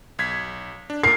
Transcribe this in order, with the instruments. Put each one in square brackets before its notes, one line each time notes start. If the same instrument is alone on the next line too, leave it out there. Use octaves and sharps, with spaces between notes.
[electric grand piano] B1 G#6 B6
D4
[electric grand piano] A#2 A#4 [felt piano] C7